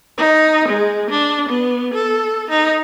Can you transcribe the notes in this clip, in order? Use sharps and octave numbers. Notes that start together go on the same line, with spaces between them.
D#4
G#3
D4
B3
A4
D#4